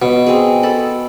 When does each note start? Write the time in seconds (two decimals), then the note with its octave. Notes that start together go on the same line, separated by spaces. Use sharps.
0.02 B2
0.26 C4 G#4
0.63 A4 B5